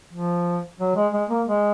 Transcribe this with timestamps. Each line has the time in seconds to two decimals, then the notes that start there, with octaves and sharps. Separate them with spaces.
0.13 F3
0.80 F#3
0.96 G#3
1.13 G#3
1.29 A#3
1.46 G#3